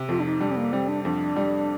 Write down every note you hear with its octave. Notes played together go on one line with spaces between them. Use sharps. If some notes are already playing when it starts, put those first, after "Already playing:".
Already playing: C3
F2 F4
D4
D#4
G3 D4
C4
A#3
G3 C4
D4
F2 D4
G3